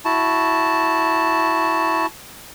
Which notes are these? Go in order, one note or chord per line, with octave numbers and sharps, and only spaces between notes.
E4 F#4 A5